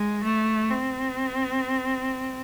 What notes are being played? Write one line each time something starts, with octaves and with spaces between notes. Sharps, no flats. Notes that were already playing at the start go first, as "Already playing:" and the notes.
Already playing: G#3
A3
C4